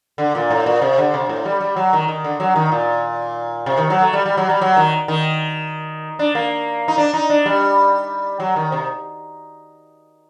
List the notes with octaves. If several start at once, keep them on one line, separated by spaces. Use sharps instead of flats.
D3
A#2
A2
A#2
C3
D3
C3
A2
G3
G3
F#3
D#3
D#3
D3
F#3
D#3
A#2
C3
D#3
F#3
A3
G3
G3
F#3
G3
F#3
D#3
D#3
D4
A#3
D#4
D4
D#4
D4
G3
F#3
D#3
C3